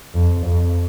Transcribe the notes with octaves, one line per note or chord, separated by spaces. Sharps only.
F2
F2